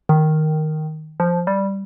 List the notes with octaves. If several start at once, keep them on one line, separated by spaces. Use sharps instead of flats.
D#3
F3
G3